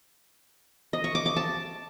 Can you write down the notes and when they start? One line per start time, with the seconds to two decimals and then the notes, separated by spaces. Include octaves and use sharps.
0.93 D#5
1.04 C#6
1.15 D6
1.26 D6
1.36 A5